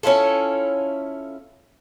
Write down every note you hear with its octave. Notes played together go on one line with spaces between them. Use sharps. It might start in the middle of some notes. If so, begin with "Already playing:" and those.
C#4 E4 F4 A4